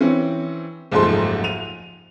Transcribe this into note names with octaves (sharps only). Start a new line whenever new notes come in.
E3 C4 C#4
F#1 D#2 G#2 F3 A3 C6
D#7 F7